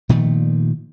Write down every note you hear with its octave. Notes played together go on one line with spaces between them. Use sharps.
A#2 D#3 F3 A3